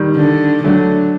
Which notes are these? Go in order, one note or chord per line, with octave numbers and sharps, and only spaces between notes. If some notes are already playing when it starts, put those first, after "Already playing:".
Already playing: D#3 G3
D3
D3 F#3 A3